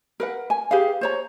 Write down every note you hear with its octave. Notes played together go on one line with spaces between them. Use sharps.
A#4 B4 F#5
G#5
G4 G#4 B4 F5
C5 C#5 A#5